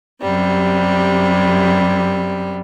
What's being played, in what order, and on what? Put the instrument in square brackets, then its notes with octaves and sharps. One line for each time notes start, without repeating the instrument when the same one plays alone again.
[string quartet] F#2 C3 G3